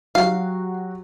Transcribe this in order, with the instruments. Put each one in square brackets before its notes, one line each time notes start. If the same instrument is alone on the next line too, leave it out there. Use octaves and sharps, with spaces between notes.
[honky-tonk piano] F#3 F#4 G4 [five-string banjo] F5